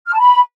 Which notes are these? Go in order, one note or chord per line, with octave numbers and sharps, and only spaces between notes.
F6
A5
B5